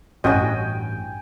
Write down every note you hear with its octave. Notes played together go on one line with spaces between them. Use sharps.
A1 G2 C#4 F#4 D#5 G5 G#5